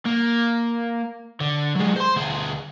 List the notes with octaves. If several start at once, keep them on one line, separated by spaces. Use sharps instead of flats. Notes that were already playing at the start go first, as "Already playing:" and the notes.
A#3
D3
F#3 G#3
C5 C6
D2 G#4